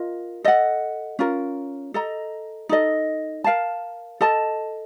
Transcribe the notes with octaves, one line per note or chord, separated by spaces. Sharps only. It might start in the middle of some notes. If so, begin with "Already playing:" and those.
Already playing: F4 A#4 D#5
A4 D#5 F#5
C#4 F4 A#4
A4 D#5 A#5
D#4 A4 D#5
A#4 F5 A5
A4 D#5 A5